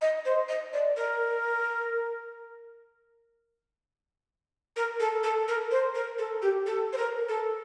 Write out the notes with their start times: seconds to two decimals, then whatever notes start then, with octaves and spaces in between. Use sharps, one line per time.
0.02 D#5
0.25 C5
0.49 D#5
0.73 D5
0.97 A#4
4.76 A#4
5.00 A4
5.24 A4
5.48 A#4
5.71 C5
5.95 A#4
6.19 A4
6.42 G4
6.67 A4
6.93 C5
6.97 A#4
7.29 A4